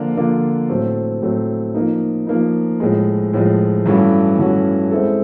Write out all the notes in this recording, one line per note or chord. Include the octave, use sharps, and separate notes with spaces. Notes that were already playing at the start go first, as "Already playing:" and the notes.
Already playing: D3 F3 A#3 D4 F4
D3 F3 A#3 D4 F4
A2 F#3 A3 C4
A2 F#3 A3 C4
F3 A#3 D#4
F3 A#3 D#4
A2 F3 G#3
A2 F3 G#3
G2 E3 A3 C#4 F#4
G2 E3 A3 C#4 F#4
G#3 C4 E4 A4